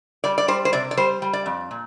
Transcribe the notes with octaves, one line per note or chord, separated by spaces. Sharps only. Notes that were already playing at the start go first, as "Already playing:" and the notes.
G3 D5
D5
G3 C5
C5
C3 D5
D5
G3 C5
G3
D5
F2
A#2